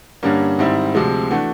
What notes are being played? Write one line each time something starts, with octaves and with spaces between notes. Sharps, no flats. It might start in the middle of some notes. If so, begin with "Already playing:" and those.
G2 D3 G3 A#3 C#4
G#2 D#3 G3 C4 E4
D2 C3 F3 G#3
E3 A3 D4 F#4